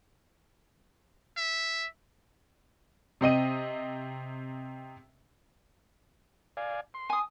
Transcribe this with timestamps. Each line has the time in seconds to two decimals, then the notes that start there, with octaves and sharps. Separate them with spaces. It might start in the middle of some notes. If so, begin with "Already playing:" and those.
1.37 E5
3.21 C3 C4 D#5 D#7
6.57 D5 F5 G#5
6.94 C6
7.10 G#5 D#6